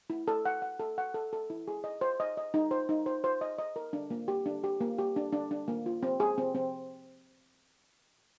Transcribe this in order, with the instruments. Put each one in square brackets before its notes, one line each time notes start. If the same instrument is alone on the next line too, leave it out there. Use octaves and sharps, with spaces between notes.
[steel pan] E4
A4
F#5
F#5
A4
F#5
A4
A4
E4
G#4
D#5
C5
D#5
D#5
D#4
C5
D#4
C5
C5
D#5
D#5
A#4
D4
A#3
G4
D4
G4
A#3
G4
D4
D4
D4
A#3
F4
C4
G#4
C4
C4